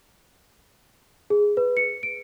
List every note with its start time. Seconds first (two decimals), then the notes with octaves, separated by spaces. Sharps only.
1.30 G#4
1.57 B4
1.77 C#7
2.03 D7